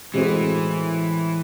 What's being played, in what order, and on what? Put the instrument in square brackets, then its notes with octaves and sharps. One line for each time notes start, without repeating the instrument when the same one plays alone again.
[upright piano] A2 G#3 C4 F#4 [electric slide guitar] E3